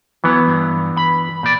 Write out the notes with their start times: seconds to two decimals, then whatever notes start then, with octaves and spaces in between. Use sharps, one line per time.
0.24 E3 F#3 B3
0.47 G2
0.97 B5
1.43 A#2 D5